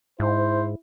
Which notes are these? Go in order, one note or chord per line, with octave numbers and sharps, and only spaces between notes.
G#2 E4 C5